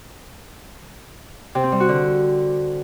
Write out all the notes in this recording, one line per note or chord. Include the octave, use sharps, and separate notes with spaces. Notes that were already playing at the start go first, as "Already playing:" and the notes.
C3
C4
G3
F#4
D3